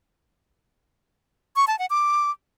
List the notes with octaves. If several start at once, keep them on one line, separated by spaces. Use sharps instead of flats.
C#6
A5
F#5
D6